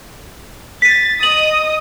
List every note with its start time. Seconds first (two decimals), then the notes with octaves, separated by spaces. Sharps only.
0.82 A6 B6 D#7
1.23 D#5 D#6 F#7